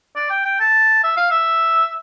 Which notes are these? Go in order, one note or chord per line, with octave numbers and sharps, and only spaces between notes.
D5
G5
G5
A5
E5
F5
E5